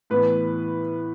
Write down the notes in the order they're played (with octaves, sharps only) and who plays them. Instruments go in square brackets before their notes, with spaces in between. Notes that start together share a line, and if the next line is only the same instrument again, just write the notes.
[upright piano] A2 E3 B3 B4